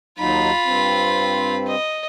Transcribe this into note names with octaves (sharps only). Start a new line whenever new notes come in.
D#2 F#3 D#4 F4 B5
G2 C4
D#5